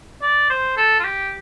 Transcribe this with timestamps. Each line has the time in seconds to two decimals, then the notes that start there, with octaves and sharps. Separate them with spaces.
0.22 D5
0.50 C5
0.77 A4
0.99 F4
1.04 G4